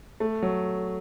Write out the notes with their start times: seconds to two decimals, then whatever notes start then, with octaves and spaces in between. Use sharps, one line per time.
0.20 A3
0.42 F#3